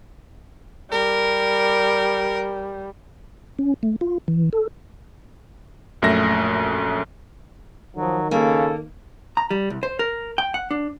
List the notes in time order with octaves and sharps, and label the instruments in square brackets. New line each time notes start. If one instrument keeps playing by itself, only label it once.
[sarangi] G3 [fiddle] A#4
[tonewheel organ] C#4
A3
F4
E3
A4
[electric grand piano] A#1 F#2 A3 E5 A#6
[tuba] D#3 [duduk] F3 [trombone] F#3
[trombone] C#3 [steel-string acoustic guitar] A#3 [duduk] A4
[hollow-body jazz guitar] A#5
G3
C2
C5
A#4
G5
F#5
D4